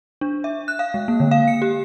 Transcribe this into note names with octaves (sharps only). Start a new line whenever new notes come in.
D4
E5
F#6
F5
G#3
A#3
D3
F5
C#7
G4